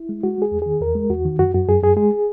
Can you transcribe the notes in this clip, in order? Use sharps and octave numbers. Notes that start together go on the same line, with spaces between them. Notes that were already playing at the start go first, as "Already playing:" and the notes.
Already playing: E4
G#3
G#3 F#4
G#3 G#4
E2
D#3 G#4
E2 A#4
G#3
E2 F#4
D#3
F#2 F#4
F#2 F#4
F#2 G#4
F#2 G#4
G#3 G#4